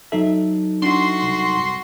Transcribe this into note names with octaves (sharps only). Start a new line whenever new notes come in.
F#3 D#4 A4 E5
D4 E4 F#4 C6
C2